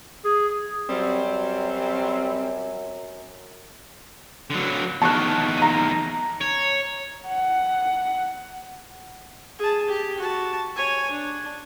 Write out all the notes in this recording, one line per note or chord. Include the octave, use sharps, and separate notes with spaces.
G#4
F#2 F#3 G3 C4
D3 F#3
E2 D#3 A5 C#6 F#6
A#5 D#7
C#5
F#5
G#4 A5
G4
F#4 A5
C#5 G#5
D4